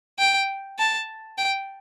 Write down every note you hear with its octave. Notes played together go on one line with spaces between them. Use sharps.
G5
A5
G5